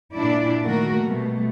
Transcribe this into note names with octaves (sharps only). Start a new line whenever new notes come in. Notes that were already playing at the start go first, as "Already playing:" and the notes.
A#2 D4 E4 D5
D#3 A3 A#3 F#4 A#4
B2 G3 A3